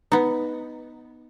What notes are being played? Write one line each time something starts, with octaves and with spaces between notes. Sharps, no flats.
B3 D#4